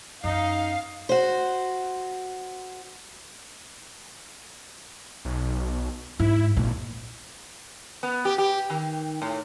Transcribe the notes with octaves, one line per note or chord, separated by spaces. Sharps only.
F#2 C#4 D#4 F5
F#4 C5
B1
G#2 E4
G#1 A#2
B3
G4
G4
D#3
A2